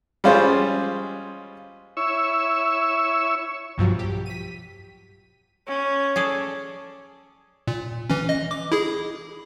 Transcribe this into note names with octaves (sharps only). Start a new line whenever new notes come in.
G3 G#3 C#4 F4 G#4 C5
E4 C#5 C#6 E6
B1 G2 F3 F#3
G4
B6 D#7
C#4
G#4 A4 D5
A#2
E3 C#4
D#5
D6
E4 G#4